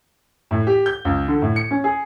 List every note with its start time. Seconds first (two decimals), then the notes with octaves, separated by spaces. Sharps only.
0.51 A2
0.67 G4
0.86 G6
1.05 C#2
1.28 D3
1.42 A2
1.56 C#7
1.71 C#4
1.84 G#4